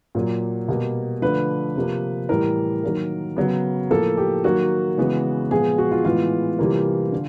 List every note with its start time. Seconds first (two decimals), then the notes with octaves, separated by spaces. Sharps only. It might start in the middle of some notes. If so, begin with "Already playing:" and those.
0.15 A#2 F#3 A#3
0.68 B2 G3 A#3
1.22 D3 F3 A3 B4
1.76 C3 F3 A#3
2.29 A2 E3 G3 A#4
2.83 D#3 F#3 A#3
3.36 C#3 F#3 B3
3.91 A2 F3 A#3 A4
4.17 G4
4.44 D#3 F#3 A#3 F#4
4.97 C#3 E3 G#3 B3
5.51 A#2 F3 G#3 B3 G#4
5.78 F#4
5.92 F4
6.05 A2 E3 G#3 B3 F4
6.59 C3 E3 G3 A#3
7.12 D3